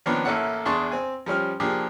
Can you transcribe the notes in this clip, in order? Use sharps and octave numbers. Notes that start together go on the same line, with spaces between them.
D#3 F3 A#3 B3 C#4 D4
A1 A#3 E4 A4 C#5 F#5
E2 D4 G#4 A5 C6 C#6
C4 G#5
F3 G3 C#4 F6
F3 A#3 D4 G4 G#4